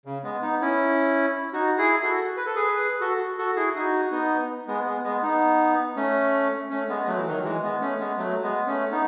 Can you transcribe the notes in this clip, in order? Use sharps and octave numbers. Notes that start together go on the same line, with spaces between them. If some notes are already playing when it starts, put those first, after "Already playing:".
C#3
G#3 B3
B3 D#4
C#4 E4
D#4 F#4
E4 G#4
F#4 A4
B4
A4
G#4 B4
F#4 A4
F#4 A4
E4 G#4
D#4 F#4
B3 D#4
G#3 B3
G#3 B3
G#3 B3
B3 D#4
A3 C#4
A3 C#4
G#3 B3
G#3
F#3 A3
E3
D#3 F#3
E3 G#3
G#3 B3
A3 C#4
G#3 B3
F#3 A3
G#3 B3
A3 C#4
B3 D#4